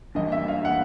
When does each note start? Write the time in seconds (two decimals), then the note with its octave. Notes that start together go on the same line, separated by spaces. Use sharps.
0.15 E3 G3 A#3 D4 D#5
0.32 E5
0.48 F5
0.65 F#5